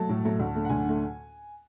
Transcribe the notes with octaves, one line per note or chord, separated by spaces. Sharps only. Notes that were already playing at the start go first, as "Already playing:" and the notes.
Already playing: F#3 A3 A5
A2
F#3 A3
D2
D3 A3
F#5
D2 G#5
D3 A3